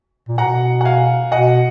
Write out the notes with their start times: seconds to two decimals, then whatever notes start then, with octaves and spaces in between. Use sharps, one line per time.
0.28 A#2
0.38 B2 F#5 A#5
0.81 F#5
0.85 F5 G#5
1.31 B2 D#5 F#5